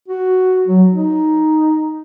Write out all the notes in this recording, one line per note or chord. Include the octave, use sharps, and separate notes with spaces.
F#4
F#3
D#4